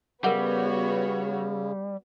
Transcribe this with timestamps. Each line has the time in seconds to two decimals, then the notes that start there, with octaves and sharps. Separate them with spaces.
0.24 C#3 G3 B3 F#4 A#4 C#5 E5 F#5